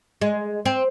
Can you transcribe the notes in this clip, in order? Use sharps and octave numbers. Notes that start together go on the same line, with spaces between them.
G#3
C4